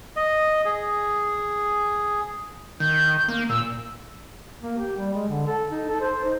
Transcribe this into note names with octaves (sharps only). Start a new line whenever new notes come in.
D#5
G#4
D#3 G6
A#3
A#2 E6
A#3
G4
G3
G#3
D3
A4
D#4
A4
C5
D#4